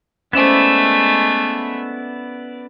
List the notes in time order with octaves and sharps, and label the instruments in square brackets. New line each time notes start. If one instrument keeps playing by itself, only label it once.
[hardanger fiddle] G#3 A3 [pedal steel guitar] B3 E4 D5 [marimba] C#4 C5